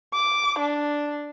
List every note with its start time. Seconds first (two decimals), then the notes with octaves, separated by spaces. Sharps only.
0.14 D6
0.58 D4